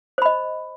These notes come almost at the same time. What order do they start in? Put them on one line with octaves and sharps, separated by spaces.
C5 B5 D#5